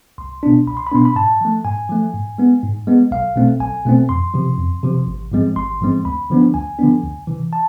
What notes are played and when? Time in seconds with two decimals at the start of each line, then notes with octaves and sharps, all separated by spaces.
0.18 C2 C6
0.43 B2 B3 D4
0.67 C2 B5
0.77 C6
0.87 B5
0.91 B2 B3 D4 C6
1.05 B5
1.16 G#2 A5
1.41 F3 A3
1.64 G#2 G#5
1.89 F3 A3
2.14 G#2
2.38 G#3 B3
2.63 G#2
2.87 G#3 B3
3.11 B1 F5
3.36 B2 A3 C4
3.60 B1 G#5
3.85 B2 A3 C4
4.09 F2 C6
4.34 C3 F3
4.58 F2
4.83 C3 F3
5.07 A1
5.32 G#2 F3 G#3 C4
5.56 A1 C6
5.81 G#2 F3 G#3 C4
6.05 D2 B5
6.30 D3 F3 B3 D4
6.54 D2 G#5
6.79 D3 F3 B3 D4
7.04 D2
7.27 C3 E3
7.53 A5